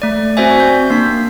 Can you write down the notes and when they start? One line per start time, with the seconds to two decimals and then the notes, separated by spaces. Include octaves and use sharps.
0.02 A3 D5
0.37 C4 F#4 C5 D5 E5 G#5
0.60 C4 G6
0.90 A#3 D4 B6